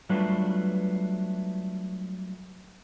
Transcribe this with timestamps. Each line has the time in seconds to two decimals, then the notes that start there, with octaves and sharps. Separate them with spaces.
0.09 F#3 G3 A3 D4 F4 B4